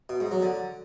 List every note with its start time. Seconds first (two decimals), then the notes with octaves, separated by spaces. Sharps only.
0.09 B2
0.20 G#2
0.31 F#3
0.42 D3